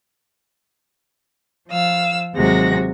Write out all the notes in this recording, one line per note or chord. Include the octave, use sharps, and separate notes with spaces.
F3 F5 E6
D#2 C3 F#3 G#3 F#4 A#6